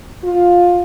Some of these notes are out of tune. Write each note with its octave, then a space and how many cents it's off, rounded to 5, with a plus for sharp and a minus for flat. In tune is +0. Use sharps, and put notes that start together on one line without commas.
F4 +15